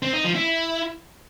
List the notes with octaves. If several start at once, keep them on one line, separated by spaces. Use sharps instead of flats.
C4
D#4
F3
E4